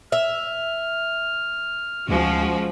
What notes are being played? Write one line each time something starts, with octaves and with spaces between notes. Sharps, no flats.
E5 F6
D2 F3 G#3 C#4 F#4